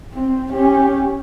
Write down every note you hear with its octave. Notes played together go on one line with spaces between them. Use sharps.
C4
C#4 G4